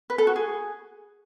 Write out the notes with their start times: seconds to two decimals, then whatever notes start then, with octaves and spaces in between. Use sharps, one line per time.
0.10 B4
0.18 A4
0.27 F#4
0.36 G#4